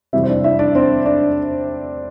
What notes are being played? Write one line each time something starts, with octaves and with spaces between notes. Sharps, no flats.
F2 C3 E3 G3 E4 E5
C5
D4 D5
E4 E5
D4 D5
C4 C5
D4 D5